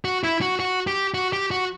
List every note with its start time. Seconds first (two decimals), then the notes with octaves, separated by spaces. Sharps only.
0.05 F#4
0.24 E4
0.41 F#4
0.60 F#4
0.87 G4
1.14 F#4
1.33 G4
1.51 F#4